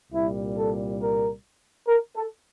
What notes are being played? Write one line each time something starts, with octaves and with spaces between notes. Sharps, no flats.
C2 A#2 G3 E4
A4
A#4
A#4
A4